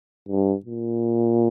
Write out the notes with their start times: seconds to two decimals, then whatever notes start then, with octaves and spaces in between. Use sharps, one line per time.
0.29 G2
0.66 A#2